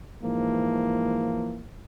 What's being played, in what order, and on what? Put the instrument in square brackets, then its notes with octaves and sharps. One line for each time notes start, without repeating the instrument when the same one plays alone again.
[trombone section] G#2 E3 F3 A#3